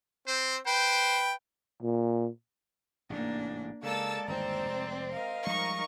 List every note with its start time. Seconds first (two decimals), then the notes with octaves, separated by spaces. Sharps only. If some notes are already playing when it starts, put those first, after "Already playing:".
0.27 C4 C5
0.67 B4 C5 G5
1.83 A#2
3.10 A1 G#2 C3 A#3 D4
3.83 C#3 G#3 A#3 A4 D5 A5 E6 A6
4.28 G1 D#2 C4 A#5 E6
4.65 F1
5.12 A#4 D#5 F5
5.47 F3 G3 G#3 D#4 A#4 C#6